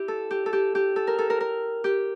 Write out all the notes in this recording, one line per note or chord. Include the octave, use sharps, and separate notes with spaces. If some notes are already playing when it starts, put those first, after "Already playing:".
Already playing: E4 G4
A4
G4
A4
G4
G4
A4
A#4
A4
A#4
A#4
G4